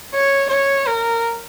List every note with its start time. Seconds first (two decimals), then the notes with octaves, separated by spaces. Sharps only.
0.15 C#5
0.50 C#5
0.86 A#4